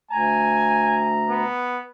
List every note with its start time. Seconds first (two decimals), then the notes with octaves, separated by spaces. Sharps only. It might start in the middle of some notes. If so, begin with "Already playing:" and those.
0.11 D2 G#5 A#5
1.30 B3